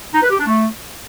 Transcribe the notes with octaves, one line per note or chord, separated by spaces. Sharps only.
D#4
B4
G4
D4
A3